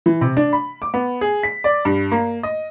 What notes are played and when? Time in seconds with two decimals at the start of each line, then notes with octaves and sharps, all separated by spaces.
0.06 E3
0.21 C3
0.37 D4
0.53 B5
0.82 D6
0.94 B3
1.21 G#4
1.43 B6
1.64 D5
1.85 G2
2.12 A#3
2.43 D#5